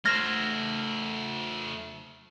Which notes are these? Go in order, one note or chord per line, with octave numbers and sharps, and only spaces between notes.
A3 C5 F6 G#6 A#6